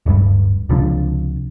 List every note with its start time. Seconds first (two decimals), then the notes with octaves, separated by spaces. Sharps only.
0.06 D1 G2
0.69 C#2 C3 F3 D4